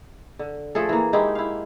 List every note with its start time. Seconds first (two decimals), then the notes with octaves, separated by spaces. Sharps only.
0.39 D3
0.75 F3 A3 G#4 A4
0.89 E3 A#3
1.13 G#3 D#4 E4 G4
1.35 E4 F5